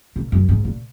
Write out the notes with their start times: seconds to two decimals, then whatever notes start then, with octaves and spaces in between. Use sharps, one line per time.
0.16 A#2
0.32 F#2
0.49 G#2
0.65 A#2